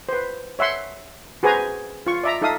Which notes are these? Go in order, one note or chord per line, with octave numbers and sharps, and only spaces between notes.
B4 C5
C#5 E5 F#5 C6
F#4 G#4 B4 C5 G#5 A#5
F4 C#6
D5 E5 A#5
D#4 A4 E5 F5 D#6